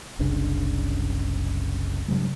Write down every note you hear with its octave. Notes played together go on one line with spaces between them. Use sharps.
F#1 C2 C#3 D4
G2 C#3 F#3 G#3